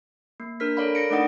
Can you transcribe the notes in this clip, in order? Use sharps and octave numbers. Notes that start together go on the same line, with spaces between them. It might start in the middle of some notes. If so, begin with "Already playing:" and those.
A#3
D4 A#4 F6 B6
A4 A#4 C#5 D5 F5 B5
A#6 C#7 D7
A3 D4 D#4 D5 F#5 D#6